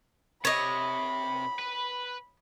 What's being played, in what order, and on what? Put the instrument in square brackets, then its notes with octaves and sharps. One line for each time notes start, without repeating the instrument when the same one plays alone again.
[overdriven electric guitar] C3 [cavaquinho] C#5 D#5 [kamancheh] B5
[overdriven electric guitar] B4